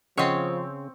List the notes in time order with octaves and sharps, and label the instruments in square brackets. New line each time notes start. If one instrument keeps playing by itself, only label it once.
[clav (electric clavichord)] C#3 [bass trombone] F3 [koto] C4 C#5 [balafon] D#5 F#5 G5